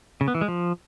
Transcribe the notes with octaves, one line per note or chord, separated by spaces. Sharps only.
C#3
B3
E3
G#3
F3